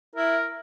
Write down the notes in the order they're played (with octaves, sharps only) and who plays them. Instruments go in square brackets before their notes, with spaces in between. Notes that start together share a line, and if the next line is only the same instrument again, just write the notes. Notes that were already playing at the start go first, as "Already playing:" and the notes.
[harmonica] E4 [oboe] A#4